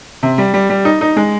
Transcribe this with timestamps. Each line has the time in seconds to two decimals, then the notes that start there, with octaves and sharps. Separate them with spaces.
0.23 C3
0.38 G3
0.54 G3
0.70 G3
0.85 D#4
1.01 D#4
1.16 G#3